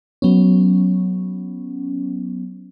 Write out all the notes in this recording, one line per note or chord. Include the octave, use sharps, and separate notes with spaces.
F#3 B3 C#4